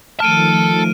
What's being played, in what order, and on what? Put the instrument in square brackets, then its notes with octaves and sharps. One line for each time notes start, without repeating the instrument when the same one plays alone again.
[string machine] D#3 F3 A3 [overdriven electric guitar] A4 A5 [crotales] F6 D7 D#7